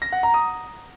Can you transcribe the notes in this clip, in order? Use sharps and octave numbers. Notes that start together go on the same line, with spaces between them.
A#6
F#5
A#5
D#6